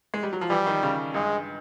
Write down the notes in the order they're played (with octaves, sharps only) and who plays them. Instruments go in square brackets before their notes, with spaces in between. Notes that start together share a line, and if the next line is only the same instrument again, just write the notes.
[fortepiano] G#3
G3
F#3
F3
[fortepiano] E3 [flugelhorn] G3
[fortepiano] D#3
C#3
[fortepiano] G2 [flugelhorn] G#3